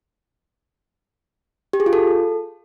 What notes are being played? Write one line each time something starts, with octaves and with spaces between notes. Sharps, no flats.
G4
G#4
F4
A4